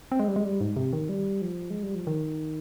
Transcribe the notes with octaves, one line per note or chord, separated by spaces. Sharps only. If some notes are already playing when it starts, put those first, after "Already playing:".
C4
G#3
G3
G#3
G3
G#2
C3
D#3
G3
F3
G#3
G3
F3
D#3